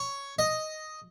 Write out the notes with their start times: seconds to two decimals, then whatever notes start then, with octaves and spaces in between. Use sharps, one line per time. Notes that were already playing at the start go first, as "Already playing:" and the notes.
Already playing: C#5
0.39 D#5